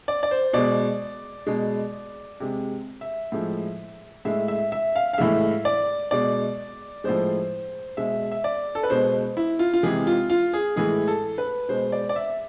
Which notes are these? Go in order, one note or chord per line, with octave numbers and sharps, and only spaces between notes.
D5
D5
C5
B2 G#3 D5
B2 G#3
C3 G#3
E5
A2 F3 G#3
A2 G#3 E5
E5
E5
F5
F5
A2 E3 G#3 E5
D5
B2 G#3 D5
A2 F3 G#3 C5
B2 G#3 E5
E5
D5
A4
B4
B2 G#3 C5
E4
F4
F4
C3 E3 G#3 G#4
F4
F4
G#4
A2 E3 G#3 G#4
A4
B4
B2 G#3 C5
D5
D5
E5